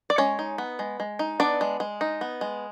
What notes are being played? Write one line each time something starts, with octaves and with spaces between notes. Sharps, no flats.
D5
G#3 C#4 C#5
D#4
B3
G#3
G#3
D#4
B3 D4 D5
G#3
G#3
D#4
B3
G#3